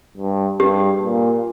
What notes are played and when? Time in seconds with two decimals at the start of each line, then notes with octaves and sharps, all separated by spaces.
0.17 G2
0.60 G2 G4
1.02 A#2